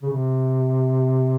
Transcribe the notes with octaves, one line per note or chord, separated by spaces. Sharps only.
C#3
C3